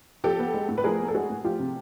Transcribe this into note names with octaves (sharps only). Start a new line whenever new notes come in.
F3 G4 A4
B3
G#3
A2
B4
F3 G#4 A#4
B3
A4
G#3 F#4 G#4
A2
F3 F4 G4
C3